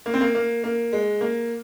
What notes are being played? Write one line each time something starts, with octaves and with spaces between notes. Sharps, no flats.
A#3
C4
A#3
A#3
A#3
G#3
A#3